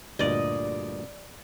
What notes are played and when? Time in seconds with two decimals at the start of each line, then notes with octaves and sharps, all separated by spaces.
0.19 D2 G2 A#2 D5 D#5